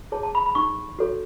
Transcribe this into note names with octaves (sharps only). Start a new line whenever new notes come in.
G#4 C#5 A5
A5
B5
B5
D#4 C#6
F#4 A4 C#5